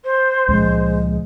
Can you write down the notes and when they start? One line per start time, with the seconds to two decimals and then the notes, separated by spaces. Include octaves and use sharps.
0.04 C5
0.48 C#2 A#2 F3 G#3